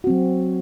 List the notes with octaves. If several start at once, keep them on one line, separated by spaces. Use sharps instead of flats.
F#3 C4 F#4